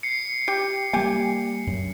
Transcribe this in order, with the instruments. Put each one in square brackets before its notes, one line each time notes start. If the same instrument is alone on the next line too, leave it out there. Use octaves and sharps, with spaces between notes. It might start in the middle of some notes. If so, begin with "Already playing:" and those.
[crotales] C7 C#7
[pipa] G4
[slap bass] G3 A#3 [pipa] G4 G#5
[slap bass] F#2